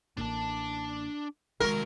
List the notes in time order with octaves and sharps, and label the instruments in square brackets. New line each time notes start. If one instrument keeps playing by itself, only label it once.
[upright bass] A1 A#3 [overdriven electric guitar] D4 A5
[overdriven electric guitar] C2 F#3 [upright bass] D#3 G#3 [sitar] A#4